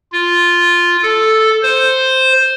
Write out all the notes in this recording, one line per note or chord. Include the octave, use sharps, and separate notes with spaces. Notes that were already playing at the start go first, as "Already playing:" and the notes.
F4
A4
C5